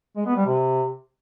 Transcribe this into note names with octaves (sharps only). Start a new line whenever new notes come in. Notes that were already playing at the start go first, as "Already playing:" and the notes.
G#3
B3
G3
C3